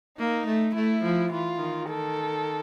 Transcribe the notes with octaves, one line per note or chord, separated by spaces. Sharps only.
A#3 D#4
A3
A3 E4
F3
E3 F4
D#3
A4